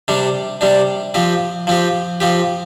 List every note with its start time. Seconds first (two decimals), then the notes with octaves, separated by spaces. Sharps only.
0.08 C3 G3 D4
0.61 C3 G3 D4
1.14 F3 C4 G4
1.67 F3 C4 G4
2.20 F3 C4 G4